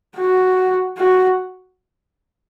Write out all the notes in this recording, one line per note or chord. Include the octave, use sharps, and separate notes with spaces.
F#4
F#4